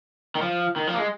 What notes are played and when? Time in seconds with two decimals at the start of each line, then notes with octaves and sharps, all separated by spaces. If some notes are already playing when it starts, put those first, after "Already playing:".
0.35 D#3
0.42 F3
0.76 D#3
0.87 F3
0.94 A#3
0.99 G#3